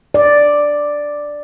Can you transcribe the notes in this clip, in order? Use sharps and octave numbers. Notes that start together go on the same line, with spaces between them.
D5